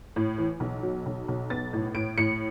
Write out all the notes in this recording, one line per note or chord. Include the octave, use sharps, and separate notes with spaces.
A2
E3
B1
F#3
B1
B1
B3 A6
A2
A2 D7
A2 C#7